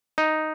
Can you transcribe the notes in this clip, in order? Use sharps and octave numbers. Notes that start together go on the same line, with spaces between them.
D#4